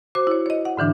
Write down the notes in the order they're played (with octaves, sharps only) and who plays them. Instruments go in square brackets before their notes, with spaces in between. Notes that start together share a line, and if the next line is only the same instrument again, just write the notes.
[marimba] F#4 C5 D6
E4 C#5
C#5 D#5
F#5
G#2 D3 E3 D4